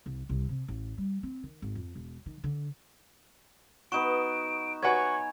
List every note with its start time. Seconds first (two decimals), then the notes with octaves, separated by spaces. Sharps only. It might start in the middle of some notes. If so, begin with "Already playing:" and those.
0.06 C2
0.29 C2
0.49 C3
0.68 A1
0.98 G3
1.23 C4
1.43 D#3
1.62 G#1
1.75 F2
1.95 E1
2.26 D#3
2.44 D3
3.92 B3 D#4 F#4 C#6 D7 E7
4.83 F#4 B4 C#5 F#5 G#5 C#6 G#6